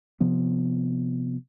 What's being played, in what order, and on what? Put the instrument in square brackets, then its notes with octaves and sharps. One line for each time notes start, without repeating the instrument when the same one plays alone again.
[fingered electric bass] C3 F3 B3